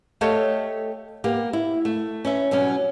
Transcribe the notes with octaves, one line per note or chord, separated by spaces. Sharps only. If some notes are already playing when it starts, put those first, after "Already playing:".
A3 G4 A4 C#5 D#5 F5
A#3 B3 G4
E4
A3
C#4 B4 E5
B2 F#3 G3 C#4